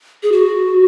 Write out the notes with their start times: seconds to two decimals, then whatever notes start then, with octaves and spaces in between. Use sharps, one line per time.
0.23 G#4
0.32 F#4